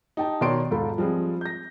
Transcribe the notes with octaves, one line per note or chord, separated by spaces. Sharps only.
D#4 G4 G5 A5
B2 D#3 C#5 D5 C6 D7
E1 G#2 F4 A4 B5
F3 G3 G#3 C4
G6 A#6